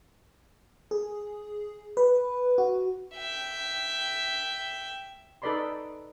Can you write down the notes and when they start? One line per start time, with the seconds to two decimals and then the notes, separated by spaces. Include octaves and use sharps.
0.91 G#4
1.97 B4
2.58 F#4
3.14 E5 G5
5.42 D#4 A4 B4 D5 B5 C6